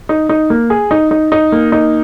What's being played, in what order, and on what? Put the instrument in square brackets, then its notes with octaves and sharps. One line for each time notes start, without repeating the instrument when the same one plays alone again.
[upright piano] D#4
D#4
A#3
G#4
D#4
D#4
D#4
A#3
D#4